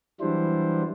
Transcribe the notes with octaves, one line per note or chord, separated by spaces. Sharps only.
E3 F#3 G3 D4 E4 C5